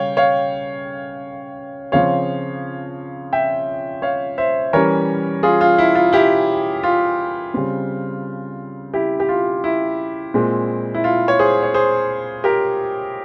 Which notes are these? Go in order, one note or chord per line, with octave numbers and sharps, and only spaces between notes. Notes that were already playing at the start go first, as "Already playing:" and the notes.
Already playing: C#3 G3 C#5 F5 G5
C#5 F5
C#3 F3 C4 C#5 F5
E5 G5
C#5 F5
C5 E5
E3 G3 C#4 A#4 C#5
F4 G#4
F4
E4
F4
E4 G4
F4
C#3 G3 C4
E4 G4
G4
F4
E4
A#2 G#3 C4
E4
F4
C#5
G#4 C5
C#5
G#4 C5
G4 A#4